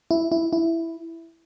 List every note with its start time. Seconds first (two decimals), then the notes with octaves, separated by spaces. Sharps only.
0.11 E4
0.32 E4
0.53 E4